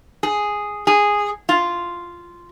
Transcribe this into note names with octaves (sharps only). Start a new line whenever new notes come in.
G#4
G#4
F4